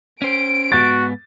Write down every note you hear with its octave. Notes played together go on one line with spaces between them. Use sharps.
C#4 C5 D7
G#2 B3 F#4 A6